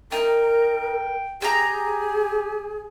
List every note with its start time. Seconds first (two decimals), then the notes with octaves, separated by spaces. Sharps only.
0.12 D#4 A#4 G5
1.42 G4 G#4 G5 A#5